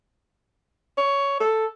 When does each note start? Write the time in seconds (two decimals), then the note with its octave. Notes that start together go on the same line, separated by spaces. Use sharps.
0.98 C#5
1.40 A4